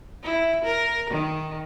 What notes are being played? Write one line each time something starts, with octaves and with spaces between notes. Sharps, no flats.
E4
A#4
D#3